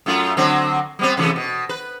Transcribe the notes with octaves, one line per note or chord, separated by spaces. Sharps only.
F#2 A3 F4
D3 F#3 C4
G3 B3 C4
C3 E3 A3
B2
B4